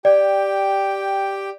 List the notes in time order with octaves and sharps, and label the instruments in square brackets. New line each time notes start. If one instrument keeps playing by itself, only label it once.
[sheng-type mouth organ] G4 G5 [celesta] D5